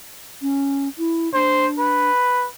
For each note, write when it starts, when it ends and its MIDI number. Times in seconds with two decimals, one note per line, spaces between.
0.42 0.88 61
0.98 1.32 64
1.34 2.10 62
1.34 1.67 72
1.79 2.47 71